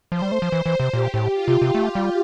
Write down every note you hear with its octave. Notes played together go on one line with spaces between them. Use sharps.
F3 C5
G3
A3
F3
E3
E3
C3
A#2 G4
A2
F4
C3
C3
A3
G3